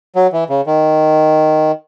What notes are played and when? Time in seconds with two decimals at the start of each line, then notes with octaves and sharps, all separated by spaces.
0.15 F#3
0.33 E3
0.49 C#3
0.67 D#3